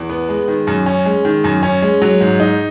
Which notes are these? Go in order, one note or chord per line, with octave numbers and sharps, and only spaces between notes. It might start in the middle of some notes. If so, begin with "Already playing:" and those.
Already playing: E2
B3
G#3
D#3
F#2
C#4
G#3
D#3
F#2
C#4
G#3
F#3
G#2
D#4